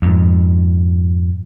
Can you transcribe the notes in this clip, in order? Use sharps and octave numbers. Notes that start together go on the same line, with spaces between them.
F2 G#2